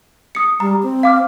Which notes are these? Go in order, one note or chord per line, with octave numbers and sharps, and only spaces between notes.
D#6 C#7
G3 A#5
C4
F5 D6 F6